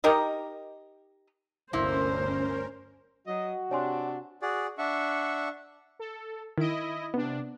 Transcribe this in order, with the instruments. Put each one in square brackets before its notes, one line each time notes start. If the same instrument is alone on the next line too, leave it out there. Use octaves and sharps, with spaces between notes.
[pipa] D#4 G4 A#4 D#5
[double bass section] G1 D2 [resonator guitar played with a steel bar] C3 A#3 E4 [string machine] C#4 A#4 [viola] C5
[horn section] F#3 D#5 [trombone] F#4
[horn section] C3 D4 [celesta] C#5 G#5 C6
[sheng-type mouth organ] F#4 G#4 D5
D4 E5 F#5 C#6
[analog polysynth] A4
[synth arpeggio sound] D#3 D7 [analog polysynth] E4 D#5
[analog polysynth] C3 D4 [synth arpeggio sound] B3